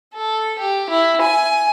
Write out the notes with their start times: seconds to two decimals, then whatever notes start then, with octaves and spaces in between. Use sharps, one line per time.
0.14 A4
0.58 G4
0.89 E4
1.21 G#5